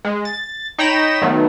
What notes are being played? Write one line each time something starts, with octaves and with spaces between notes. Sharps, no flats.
G#3
A6
D#4 C#5 G5 A#5 B5 E7
D#3 F#3 A3 B3